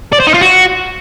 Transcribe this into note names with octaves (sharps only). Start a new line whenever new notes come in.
D5
C5
D#4
F4
F#4